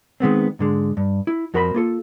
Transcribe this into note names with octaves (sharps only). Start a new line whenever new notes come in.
D#3 G#3 B3 C4
G#2 D3 G#3
G2
E4
F2 F#4 A#4 C5 A#5 B5
A#3 F4 A4